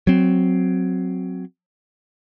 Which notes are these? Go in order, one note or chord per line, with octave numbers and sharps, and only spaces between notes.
F#3 C4